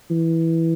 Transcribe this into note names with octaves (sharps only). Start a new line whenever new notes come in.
E3